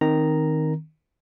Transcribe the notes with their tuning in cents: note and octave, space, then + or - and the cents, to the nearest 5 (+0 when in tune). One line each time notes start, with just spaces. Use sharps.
D#3 +0 C4 +0 A#5 +0